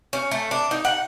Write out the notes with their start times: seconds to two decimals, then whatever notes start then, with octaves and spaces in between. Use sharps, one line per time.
0.13 C#4
0.31 A3
0.51 D4
0.71 D#4
0.85 F#5